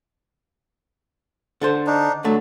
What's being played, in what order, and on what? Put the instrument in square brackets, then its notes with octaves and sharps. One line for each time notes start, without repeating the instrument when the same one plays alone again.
[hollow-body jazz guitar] D3 A4 C5
[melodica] D4 D#4
[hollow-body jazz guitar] D3 A3 [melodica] F#3